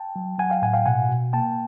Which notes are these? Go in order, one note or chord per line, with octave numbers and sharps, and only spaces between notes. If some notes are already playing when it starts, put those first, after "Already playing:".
Already playing: G5 A5
F#3
F#3 F#5 G#5
F5 G5
A2 F#5 G#5
F5 G5
B2 F#5 G#5
B2
A#3 G5 A5